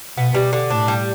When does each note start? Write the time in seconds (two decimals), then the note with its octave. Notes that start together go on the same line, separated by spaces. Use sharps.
0.17 B2 B3
0.34 G3
0.53 D3
0.70 A2 D4
0.88 G3